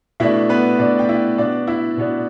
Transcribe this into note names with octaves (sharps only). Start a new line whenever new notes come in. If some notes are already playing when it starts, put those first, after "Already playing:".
B2 A3 D4 E4 E5
B3 B4
B2 A3 D4 D5
G5
E4 E5
B2 B3 D4 D5
E4 E5
B2 B3 D4